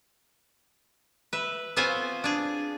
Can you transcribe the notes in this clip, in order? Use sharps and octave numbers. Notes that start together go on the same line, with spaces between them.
B4 E5
B3 C4 F4 C5 C#5 G#5
D4 G#4